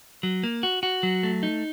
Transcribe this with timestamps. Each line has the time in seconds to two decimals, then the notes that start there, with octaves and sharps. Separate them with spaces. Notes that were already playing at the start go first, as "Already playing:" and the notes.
0.23 F#3
0.43 A#3
0.63 F#4
0.83 F#4
1.03 F#3
1.23 A3
1.43 D#4